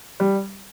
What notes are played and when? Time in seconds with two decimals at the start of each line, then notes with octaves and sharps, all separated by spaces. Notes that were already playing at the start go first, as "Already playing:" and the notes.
0.20 G3